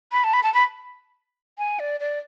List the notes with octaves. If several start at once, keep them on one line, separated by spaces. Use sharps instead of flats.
B5
A5
B5
A5
B5
G#5
D5
D5